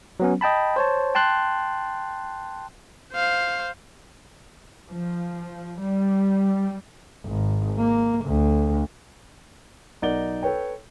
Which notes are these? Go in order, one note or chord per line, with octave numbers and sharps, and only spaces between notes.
F#3 B3 C#4
D#5 G5 A5 B5
C5 C#5 A5
G5 A5 C6 F#6
C5 F5
F3
G3
G#1
A#3
D2
B1 D#4 A#4 D5 F#5 G7
A4 B4 C#5 G5